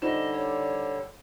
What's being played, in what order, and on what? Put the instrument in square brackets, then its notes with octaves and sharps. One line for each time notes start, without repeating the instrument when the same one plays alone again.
[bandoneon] D3 G3 [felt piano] D#4 C5 E7 [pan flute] D#5
[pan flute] C#5